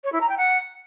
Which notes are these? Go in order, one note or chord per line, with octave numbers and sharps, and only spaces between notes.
C#5
E4
A#5
G5
F#5